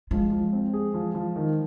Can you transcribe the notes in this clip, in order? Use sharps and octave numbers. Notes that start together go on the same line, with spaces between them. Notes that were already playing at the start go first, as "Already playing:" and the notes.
F3 G#3
F3
C4
G#4
F3
F3
D#3